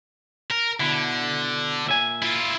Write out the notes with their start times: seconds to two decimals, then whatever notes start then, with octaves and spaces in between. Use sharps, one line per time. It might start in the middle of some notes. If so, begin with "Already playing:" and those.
0.50 A#4
0.80 B2 D3 E4
1.87 A#2 E5 G#5
2.22 E4 F4